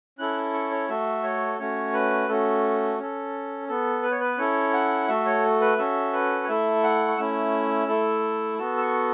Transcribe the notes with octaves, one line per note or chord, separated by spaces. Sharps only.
C#4 E4 A4 F#6
C#6
C#5
A3 F#4 A4 E5
C#5
A3 C#4 F#4 C#5
B4
A3 C#4 F#4 A4
C#4 A4
B3 A4
B4
C#5
B4
C#4 E4 A4 C#5
F#5
A3 F#4 A4 E5
C#5
B4
C#4 F#4 A4 E5
B4
C#5
A3 E4 A4 E5
F#5
C#6
A3 C#4 E4 E6
A3 E4 A4
B3 F#4 A4 E6
E6
C#6